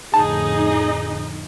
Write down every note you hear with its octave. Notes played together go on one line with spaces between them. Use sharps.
F2 A2 D3 D#4 G#4 D#5 A5